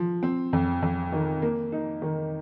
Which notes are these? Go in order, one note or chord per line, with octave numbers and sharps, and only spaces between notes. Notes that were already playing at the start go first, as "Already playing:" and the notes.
Already playing: F3
C4
F2
F2
D#3
A#3
D#4
D#3